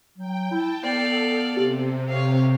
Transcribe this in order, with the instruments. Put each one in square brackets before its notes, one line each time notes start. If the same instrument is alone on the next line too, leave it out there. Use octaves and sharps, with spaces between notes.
[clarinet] F#3 [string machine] G5
[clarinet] E4 [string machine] G5 A5
[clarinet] B3 [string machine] A4 [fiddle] D5 F5
[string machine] C3 [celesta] G4
[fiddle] C#5 F5